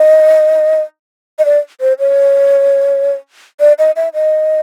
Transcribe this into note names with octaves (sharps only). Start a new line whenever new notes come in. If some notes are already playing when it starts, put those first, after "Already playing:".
Already playing: D#5
D#5
D5
C5
C#5
D5
D#5
E5
D#5